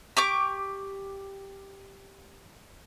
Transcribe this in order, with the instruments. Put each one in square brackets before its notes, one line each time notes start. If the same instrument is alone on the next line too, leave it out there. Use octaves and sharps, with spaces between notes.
[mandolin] G4 C#6 D6